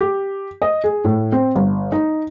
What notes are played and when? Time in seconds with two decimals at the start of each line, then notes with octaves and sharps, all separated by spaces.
0.01 G4
0.62 D#5
0.84 G#4
1.05 A2
1.32 C4
1.56 G1
1.92 D#4